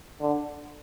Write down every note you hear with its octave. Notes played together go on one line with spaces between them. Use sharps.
D3